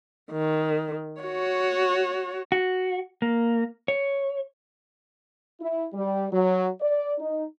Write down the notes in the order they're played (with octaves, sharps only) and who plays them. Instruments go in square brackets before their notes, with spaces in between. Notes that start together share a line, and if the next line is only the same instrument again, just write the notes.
[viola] D#3
F#4 C#5
[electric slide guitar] F#4
A#3
C#5
[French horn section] E4
G3
F#3
D5
D#4